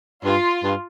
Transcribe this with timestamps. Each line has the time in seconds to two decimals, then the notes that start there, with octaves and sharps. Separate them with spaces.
0.25 G2 F4
0.63 G2